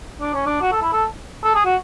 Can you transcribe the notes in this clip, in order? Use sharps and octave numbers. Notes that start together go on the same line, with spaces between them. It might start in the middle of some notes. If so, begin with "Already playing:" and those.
D4
C#4
D4
F#4
A4
E4
A4
A4
G#4
F#4